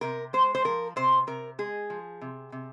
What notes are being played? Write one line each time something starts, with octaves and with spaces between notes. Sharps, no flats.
C3 A#4
G#3 C5
C5
F3 A#4
C3 C5
C3 A#4
G#3 G#4
F3
C3
C3